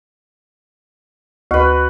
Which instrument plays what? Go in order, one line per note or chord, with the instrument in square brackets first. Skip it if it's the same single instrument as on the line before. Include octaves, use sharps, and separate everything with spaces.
[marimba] D2 [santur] F#4 B4